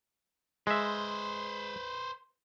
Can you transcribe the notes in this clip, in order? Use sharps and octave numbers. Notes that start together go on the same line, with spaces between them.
G#3 B4 C5 E5